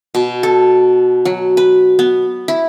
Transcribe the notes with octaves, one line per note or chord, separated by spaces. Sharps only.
B2
A4
F#3
B4
B3
E4